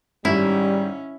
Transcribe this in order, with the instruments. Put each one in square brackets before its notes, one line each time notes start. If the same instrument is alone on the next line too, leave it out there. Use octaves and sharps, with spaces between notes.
[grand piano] G#2 D#3 [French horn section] G3 [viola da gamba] C#4 [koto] E4